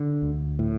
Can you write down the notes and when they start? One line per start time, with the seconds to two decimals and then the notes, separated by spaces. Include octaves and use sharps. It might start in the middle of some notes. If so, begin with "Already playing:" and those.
Already playing: D3
0.22 D2
0.59 A2